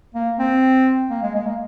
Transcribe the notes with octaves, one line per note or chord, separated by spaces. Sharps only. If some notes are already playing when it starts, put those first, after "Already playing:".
A#3
C4
A#3
G#3
G#3
A#3